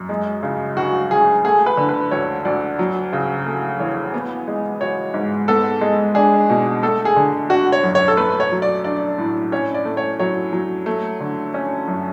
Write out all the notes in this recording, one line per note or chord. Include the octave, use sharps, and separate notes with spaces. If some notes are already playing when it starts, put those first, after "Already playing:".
Already playing: F#2
G#3
C#3
D2 F#4
D2 G#4
A3 G#4
B4
D3
B4
D2 C#5
D2 D5
F#3
C#3
A3
E2 C#5
B3
G#3
F#4 C#5
G#2
B3 A4
G#3
D4 G#4
B2
A3 A4
G#4
D3
D4 F#4
C#5
F#2
C#5
A4
A3 B4
C#5
F#3
D5
D4 D5
A2
C#4 C#5
D5
A3
C#5
F#3 C#5
F#3
A3
D3
C#4
F#2